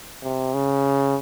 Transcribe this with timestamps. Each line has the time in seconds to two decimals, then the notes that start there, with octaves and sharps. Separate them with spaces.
0.23 C3
0.54 C#3